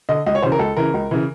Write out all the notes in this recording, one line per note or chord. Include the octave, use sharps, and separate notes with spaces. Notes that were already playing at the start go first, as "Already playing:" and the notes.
D3 D#5
C#2 D#5
C#5
C#3 E3 C5
A#4
C#2 A4
C#3 E3 A#4
C#2
C#3 E3